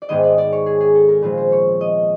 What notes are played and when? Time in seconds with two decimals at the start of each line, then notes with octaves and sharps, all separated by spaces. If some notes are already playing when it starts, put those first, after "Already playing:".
0.02 D5
0.09 G#2 D#3 G#3 B3 D#5
0.23 D5
0.38 D5
0.52 C#5
0.66 G#4
0.80 G#4
0.95 A4
1.08 A#4
1.22 A#2 F3 G#3 C4 B4
1.37 C5
1.52 C#5
1.81 D#5